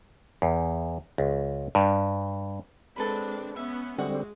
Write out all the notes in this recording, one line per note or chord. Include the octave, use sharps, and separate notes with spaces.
E2
C#2
G2
G#3 C4 D4 A4 B4 B5
B3 C#4 E5
D3 G3 G#3 C4 F#4 E5 F#5